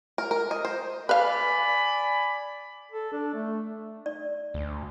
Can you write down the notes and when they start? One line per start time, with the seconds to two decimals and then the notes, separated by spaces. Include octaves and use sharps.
0.18 A#4
0.31 A#4
0.51 D#5
0.65 C5
1.09 B4 D5 F5 G#5 B5
2.92 A4
3.13 D4
3.34 A3
4.06 D5
4.54 D2